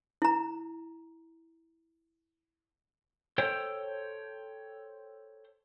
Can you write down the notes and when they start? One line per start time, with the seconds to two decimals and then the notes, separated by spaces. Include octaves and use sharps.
0.22 E4 A#5
3.38 A4 C5 C#5 G5